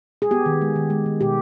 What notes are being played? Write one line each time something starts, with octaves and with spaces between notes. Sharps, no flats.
G#4
B3 G4
D#3
G#3
D#3
G#3
D#3
B2 G4